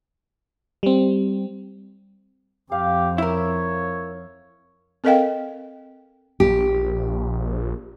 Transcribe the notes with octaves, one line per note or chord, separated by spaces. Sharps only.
G3 C4
F2 G4 F5
E4 A#4 C#5
C4 A4 A#4 D#5 F5 G5
A#1 G4